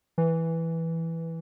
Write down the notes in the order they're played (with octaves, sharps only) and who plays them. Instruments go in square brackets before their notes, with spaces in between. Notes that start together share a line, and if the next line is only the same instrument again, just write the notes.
[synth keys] E3